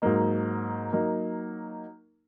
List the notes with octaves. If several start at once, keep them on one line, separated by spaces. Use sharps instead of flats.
G#2 F#3 A#3 D#4
F#3 A#3 D#4